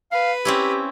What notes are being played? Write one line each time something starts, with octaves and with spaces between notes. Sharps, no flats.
B4 F5
C4 C#4 E4 G4